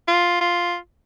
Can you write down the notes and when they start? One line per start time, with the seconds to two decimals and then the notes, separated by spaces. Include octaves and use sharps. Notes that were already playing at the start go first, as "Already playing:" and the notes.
0.08 F4
0.41 F4